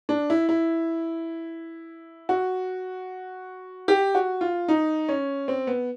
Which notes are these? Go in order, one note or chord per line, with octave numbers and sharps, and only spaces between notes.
D4
E4
E4
F#4
G4
F#4
F4
D#4
C#4
C4
B3